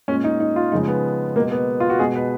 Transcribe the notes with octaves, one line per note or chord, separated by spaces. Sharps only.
A#2 G#3 C#4
D#4
D#4
F4
C#3 F3 G#3 D#4
B3
B2 G#3 A#3
B3
F4
F#4
B2 G#3 G#4
B4